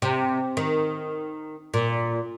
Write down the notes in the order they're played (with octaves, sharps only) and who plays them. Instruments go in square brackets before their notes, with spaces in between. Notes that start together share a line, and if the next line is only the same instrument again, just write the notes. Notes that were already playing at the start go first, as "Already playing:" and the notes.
[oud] C3
D#3
A#2